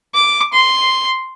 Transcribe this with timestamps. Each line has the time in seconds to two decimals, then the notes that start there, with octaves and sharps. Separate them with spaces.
0.15 D6
0.53 C6